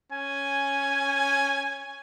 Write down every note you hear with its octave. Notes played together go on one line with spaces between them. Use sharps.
C#4 G#5